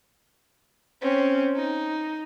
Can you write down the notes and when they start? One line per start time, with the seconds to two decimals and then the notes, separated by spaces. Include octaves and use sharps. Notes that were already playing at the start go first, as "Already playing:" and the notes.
1.02 C4 C#4
1.56 D#4